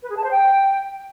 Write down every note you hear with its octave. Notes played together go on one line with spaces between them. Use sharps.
B4
G#4
A5
C5
G5